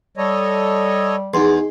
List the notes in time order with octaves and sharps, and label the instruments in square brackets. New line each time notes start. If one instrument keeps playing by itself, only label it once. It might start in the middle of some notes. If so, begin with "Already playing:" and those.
[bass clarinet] G3 [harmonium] A4 C#5 D#5
[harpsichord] E2 [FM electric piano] D#4 G#4 C6